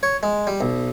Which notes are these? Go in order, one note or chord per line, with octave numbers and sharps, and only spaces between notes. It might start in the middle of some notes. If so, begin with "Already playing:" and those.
C#5
G#3
G3
B1